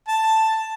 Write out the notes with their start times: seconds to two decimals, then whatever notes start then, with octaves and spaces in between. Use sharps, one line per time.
0.08 A5